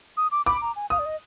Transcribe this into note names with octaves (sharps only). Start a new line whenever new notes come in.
D#6
D6
B5 D6
A#5
G#5
F5 D#6
D5
D#5